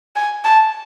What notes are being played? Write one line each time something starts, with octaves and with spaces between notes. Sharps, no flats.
G#5
A5